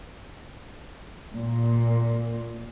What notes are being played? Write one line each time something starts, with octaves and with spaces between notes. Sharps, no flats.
A#2